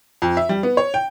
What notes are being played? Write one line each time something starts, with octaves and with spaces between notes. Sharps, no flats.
F2
E5
G3
B3
C#5
G5